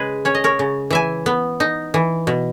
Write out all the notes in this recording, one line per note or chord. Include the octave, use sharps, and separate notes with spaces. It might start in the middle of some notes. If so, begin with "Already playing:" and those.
Already playing: C#3 G#3 G#4 B4
C#4 C#5
D#5
A#4 C#5
C#3
E3 E5 G#5
B3
D#4
E3
B2